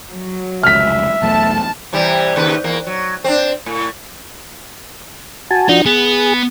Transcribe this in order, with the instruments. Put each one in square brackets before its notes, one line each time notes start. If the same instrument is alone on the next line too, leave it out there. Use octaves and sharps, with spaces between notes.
[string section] F#3
[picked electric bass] F1 C#2 [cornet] E5 [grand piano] F6 B6
[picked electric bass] B1 E2 A3 [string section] A5
[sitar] C3 E3 G3
D#2 C#3 B4
E2 A#3
F#3
C4 D4
A2
[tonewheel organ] F#4 G#5 A5
[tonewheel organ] F3 D4 F#4 [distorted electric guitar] D#4
[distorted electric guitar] B3 [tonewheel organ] G#4